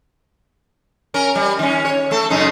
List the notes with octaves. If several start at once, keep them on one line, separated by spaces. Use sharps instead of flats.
C#4 A#4
G3
D#3 C#4
C#5
A3 A4
F#2 C#3 D#4